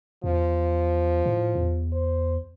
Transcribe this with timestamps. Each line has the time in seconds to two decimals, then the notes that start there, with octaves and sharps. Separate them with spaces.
0.24 E2 F3
1.26 A2
1.55 E2
1.92 C5